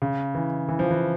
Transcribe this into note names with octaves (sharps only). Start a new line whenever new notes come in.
C#3
E3
E3
F3
E3